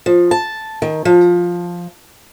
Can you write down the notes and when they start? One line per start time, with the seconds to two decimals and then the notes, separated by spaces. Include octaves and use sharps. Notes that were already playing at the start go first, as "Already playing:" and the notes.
0.06 F3
0.31 A5
0.82 D#3
1.05 F3